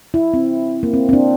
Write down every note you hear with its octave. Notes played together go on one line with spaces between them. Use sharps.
E4
C4
A#3
C4
C4
D4